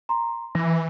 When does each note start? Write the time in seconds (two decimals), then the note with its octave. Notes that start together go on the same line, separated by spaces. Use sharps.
0.09 A#5 C6
0.55 E3 A#6